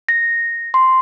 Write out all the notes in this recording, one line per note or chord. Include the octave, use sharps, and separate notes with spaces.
A#6
C6